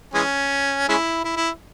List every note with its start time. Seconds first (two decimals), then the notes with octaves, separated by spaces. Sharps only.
0.14 E3 G#3 C#4
0.89 G#3 C#4 E4
1.24 E4
1.37 E4